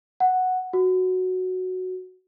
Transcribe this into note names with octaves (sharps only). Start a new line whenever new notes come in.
F#5
F#4